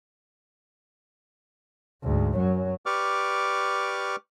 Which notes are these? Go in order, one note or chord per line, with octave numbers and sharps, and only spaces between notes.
D2 G#2
F#2 F#3
G4 B4 D5 C#6 D6 F6